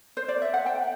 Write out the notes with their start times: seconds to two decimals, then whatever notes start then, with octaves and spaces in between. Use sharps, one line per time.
0.17 C5
0.28 D5
0.42 E5
0.54 F#5
0.66 G5